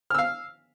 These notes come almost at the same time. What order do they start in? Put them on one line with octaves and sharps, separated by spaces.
F6 E6 F5